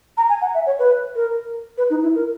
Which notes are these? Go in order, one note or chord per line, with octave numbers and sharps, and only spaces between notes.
A#5
G#5
F#5
E5
C#5
B4
A#4
B4
D#4
E4
A#4